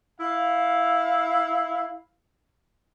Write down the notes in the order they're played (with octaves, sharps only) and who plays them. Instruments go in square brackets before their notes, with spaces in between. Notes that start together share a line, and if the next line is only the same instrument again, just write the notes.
[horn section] E4 F5